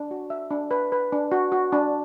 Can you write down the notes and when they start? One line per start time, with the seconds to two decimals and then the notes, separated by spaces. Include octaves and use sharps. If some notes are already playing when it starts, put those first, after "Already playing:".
Already playing: D4
0.11 F#4
0.30 E5
0.51 D4
0.71 B4
0.92 B4
1.12 D4
1.32 F#4
1.52 F#4
1.73 D4